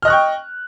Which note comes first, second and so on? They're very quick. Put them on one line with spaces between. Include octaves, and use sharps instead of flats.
F6 D#5 F#6 C#6 G5